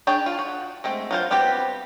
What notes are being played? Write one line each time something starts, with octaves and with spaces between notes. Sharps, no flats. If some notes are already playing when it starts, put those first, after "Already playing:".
D4 G#4 C#5 G5
F4
F#4
G#3 A3 C4
F#3 F4 C5
G3 B3 C4 G4